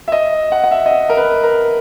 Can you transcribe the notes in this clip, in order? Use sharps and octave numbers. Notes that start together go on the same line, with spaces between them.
E5
D#5
F#5
F#5
E5
D#5
E5
A#4
B4
A#4